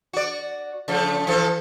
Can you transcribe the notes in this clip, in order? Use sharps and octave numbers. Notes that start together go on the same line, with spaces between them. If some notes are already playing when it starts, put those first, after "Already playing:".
F#4 D5
C#3 F3 A3
E3 F3 A4